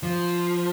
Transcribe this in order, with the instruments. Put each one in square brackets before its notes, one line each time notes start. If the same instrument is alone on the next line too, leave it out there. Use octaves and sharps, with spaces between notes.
[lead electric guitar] F3